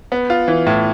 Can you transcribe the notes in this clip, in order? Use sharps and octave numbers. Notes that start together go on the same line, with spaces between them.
B3
F4
E3
A2